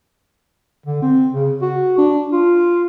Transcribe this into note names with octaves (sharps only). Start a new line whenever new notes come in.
D3
C4
C#3
F#4
D4
F4